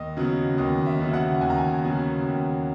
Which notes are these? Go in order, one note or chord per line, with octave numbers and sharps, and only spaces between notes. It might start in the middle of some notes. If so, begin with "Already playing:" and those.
Already playing: D#2 D#5
C#3 F#3 B3
D#2 D#5
E5
C#3 F#3 B3
F#5
D#2 G#5
A#5
G#5
C#3 F#3 B3
D#2